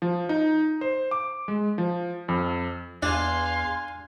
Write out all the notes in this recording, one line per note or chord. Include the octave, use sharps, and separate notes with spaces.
F3
D#4
C5
D6
G#3
F3
F2
E2 D4 F5 G#5 C6